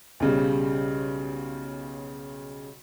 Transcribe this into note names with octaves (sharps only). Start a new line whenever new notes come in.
B1 C#3 G3